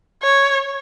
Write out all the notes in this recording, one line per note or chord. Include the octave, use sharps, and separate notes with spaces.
C#5